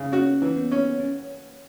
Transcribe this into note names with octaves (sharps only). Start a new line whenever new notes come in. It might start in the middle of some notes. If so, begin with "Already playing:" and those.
Already playing: C#3 C#4
C#4 F#4
E3
B3
C#4
C#4